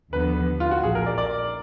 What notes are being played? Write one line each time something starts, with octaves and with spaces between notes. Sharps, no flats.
D#2 D3 F3 B3 B4
F4
F#4
A#1 A#2 F3 G#4
A#4
D5
D5